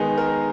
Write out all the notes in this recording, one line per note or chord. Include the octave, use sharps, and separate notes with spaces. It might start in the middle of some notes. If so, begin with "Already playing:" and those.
Already playing: D#3 G#3 B3 D#4 G#4
A#4